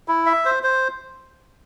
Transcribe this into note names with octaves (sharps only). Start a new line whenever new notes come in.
E4
E5
C5
C5